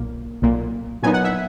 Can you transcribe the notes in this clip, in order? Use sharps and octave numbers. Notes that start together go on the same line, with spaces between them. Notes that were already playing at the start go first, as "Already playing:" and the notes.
Already playing: B1 A#2 A#3
B1 A#2 A#3
A#2 F#3 B3 D#4 G#5
F#5
E5